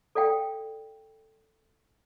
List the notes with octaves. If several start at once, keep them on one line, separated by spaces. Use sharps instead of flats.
A4 D5 F5 G5